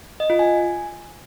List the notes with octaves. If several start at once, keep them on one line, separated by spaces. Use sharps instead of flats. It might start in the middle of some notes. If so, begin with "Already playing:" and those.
D#5
F4
G#5